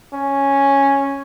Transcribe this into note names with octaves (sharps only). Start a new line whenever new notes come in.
C#4